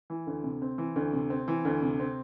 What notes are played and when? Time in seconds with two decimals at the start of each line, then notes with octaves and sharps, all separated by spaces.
0.10 E3
0.27 D2
0.44 C3
0.62 C4
0.78 E3
0.96 D2
1.13 C3
1.30 C4
1.48 E3
1.65 D2
1.82 C3
2.00 C4